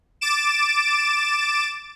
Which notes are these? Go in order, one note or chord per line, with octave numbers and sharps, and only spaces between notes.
D6 A6 D7 E7